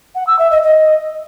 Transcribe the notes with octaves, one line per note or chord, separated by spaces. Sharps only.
F#5
E6
E5
D#5
D#5